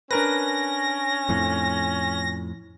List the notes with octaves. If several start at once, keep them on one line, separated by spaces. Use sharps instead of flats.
C#4 D4 A#4 B4 A#6
F2 A2